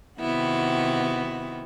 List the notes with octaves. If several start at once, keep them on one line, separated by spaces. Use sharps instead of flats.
C3 D#3 B3 E4 F#4